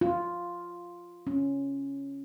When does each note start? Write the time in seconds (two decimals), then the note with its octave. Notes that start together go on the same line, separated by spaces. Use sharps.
0.01 F4
1.27 C#4